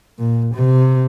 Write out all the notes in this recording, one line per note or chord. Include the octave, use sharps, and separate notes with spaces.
A#2
C3